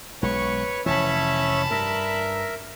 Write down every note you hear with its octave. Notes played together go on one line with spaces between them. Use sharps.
B1 G#3 B4 C#5 C#6
F1 E3 C#4 C#5 E5 A5 B5
G2 A#4 E5